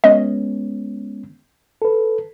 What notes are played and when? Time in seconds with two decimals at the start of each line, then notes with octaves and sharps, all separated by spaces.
0.04 G#3 B3 C#4 D#5
1.82 A4 B4